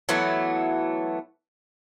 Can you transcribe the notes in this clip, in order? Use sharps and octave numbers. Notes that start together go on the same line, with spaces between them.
E3 F#3 A3 B3